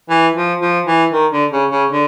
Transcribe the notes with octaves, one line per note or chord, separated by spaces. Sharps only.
E3
F3
F3
E3
D#3
D3
C#3
C#3
D3